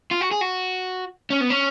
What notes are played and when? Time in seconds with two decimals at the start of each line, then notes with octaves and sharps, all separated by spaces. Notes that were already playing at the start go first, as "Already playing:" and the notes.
0.11 F4
0.21 F#4
0.31 G#4
0.41 F#4
1.30 C#4
1.41 B3
1.50 C#4